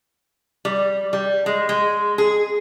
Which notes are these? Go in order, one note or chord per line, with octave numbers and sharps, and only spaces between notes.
G3
G3
G#3
G#3
G#4